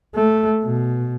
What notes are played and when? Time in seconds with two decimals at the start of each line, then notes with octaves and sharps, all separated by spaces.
0.15 A3
0.64 B2